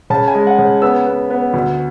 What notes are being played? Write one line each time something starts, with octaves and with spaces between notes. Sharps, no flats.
C#3 A5
G#5
G#3
F#5
C#3
B3 E6
B3
B3
D2